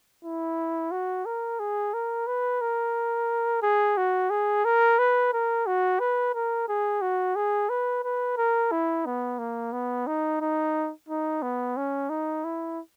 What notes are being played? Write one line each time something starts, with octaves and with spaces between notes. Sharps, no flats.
E4
F#4
A#4
G#4
A#4
B4
A#4
G#4
F#4
G#4
A#4
B4
A#4
F#4
B4
A#4
G#4
F#4
G#4
B4
B4
A#4
E4
B3
A#3
B3
D#4
D#4
D#4
B3
C#4
D#4
E4